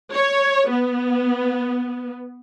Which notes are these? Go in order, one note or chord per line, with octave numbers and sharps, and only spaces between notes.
C#5
B3